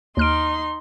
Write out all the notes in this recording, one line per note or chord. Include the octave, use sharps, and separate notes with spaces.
D#2 D#4 C6 F6 D7